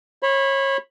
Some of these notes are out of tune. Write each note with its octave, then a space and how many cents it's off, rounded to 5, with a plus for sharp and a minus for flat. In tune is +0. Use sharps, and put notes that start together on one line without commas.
C#5 -30 B5 +0